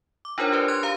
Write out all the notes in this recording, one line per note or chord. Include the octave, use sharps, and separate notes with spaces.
D6
D4 D#4 F4 A#4 C5 C#5
G4 B4 D5
C6 F#6 G#6
G4 F5 A#5